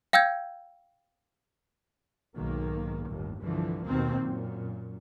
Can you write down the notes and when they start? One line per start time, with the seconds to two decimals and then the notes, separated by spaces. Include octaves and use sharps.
0.13 F5 G5 E6 G6 G#6
2.35 B1 G#2 D#3 A#3
3.06 G1 D#2 A2
3.42 C2 G2 D3 E3 F3
3.85 D#2 B2 D#3 A#3 C4
4.21 F#2 A#2